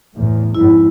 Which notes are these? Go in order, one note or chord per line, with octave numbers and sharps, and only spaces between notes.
E2 A2
F2 G#2 E4